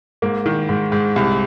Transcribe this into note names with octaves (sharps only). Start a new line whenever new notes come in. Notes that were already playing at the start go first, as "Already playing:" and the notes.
G#2 A#3
D#3
G#2
G#2
C2